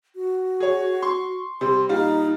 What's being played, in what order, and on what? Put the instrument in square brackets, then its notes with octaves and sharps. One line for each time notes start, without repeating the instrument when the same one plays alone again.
[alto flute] F#4
[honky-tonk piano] G#4 C#5
C6 C#6
[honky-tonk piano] C3 G3 [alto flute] C6
[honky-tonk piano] A#2 G3 F5 [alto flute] D#4